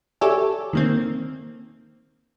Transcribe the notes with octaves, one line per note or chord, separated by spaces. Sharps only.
G4 A4 C#5 D5 E5 G#5
D#3 A#3 C4